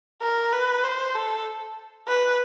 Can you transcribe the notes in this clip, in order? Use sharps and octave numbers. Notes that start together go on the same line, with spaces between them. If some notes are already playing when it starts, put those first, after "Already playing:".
A#4
B4
C5
A4
B4